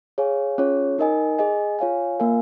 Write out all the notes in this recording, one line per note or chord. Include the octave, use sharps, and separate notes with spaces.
G#4 C#5 F5 G#5
C#4 F4 G#4 C#5
D#4 A#4 D#5 G#5
G#4 D#5 G#5
F4 C#5 F5 G#5
A#3 F4 A#4 F5 G#5